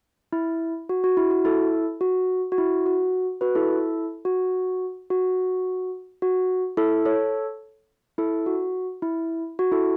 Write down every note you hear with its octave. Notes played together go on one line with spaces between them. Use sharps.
E4
F#4
F#4
E4
F#4
E4 A4
F#4
F#4
E4
F#4
F#4 B4
E4 A4
F#4
F#4
F#4
E4 A4
A4 C#5
E4 A4
F#4
E4
F#4
E4 A4